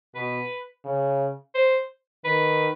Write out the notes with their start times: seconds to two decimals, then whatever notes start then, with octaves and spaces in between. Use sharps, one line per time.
0.15 B2 B4
0.85 C#3
1.55 C5
2.25 D#3 B4